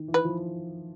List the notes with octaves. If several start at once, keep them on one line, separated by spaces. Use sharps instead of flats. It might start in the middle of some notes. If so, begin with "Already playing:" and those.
Already playing: D#3
E3
B4
F3